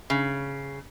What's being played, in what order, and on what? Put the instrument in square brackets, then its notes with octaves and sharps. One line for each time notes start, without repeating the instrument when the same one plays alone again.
[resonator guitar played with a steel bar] C#3